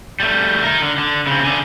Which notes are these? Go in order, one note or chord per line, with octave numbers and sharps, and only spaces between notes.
G3 A3
D#4 A#4
D3
D3
C#3 C4
D3 G#4